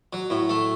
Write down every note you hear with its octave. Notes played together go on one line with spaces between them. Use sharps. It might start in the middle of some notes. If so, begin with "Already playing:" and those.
F#3
A2
A3